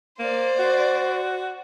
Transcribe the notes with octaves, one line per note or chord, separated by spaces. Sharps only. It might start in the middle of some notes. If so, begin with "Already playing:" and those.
A#3 C5 D5
F#4